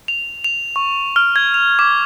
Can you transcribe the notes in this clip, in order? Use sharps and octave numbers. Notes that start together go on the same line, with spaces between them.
F7
F7
C#6
F6
G#6
F7
D6